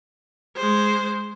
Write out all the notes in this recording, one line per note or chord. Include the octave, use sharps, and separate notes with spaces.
G#3 C5